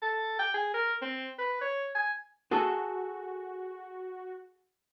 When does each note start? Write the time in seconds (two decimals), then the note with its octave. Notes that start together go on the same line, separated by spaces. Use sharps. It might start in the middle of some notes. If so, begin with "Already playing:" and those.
0.02 A4
0.39 G5
0.54 G#4
0.74 A#4
1.02 C4
1.38 B4
1.61 C#5
1.95 G#5
2.51 F#4 G#4 A4